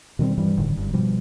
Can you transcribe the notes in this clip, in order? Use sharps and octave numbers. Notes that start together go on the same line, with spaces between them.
B2 D#3 G3 C4
G2 E3 G3
F1 A2 D3 D#3
F#1 G2
B2 F3 G3